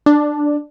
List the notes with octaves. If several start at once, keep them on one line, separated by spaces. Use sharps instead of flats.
D4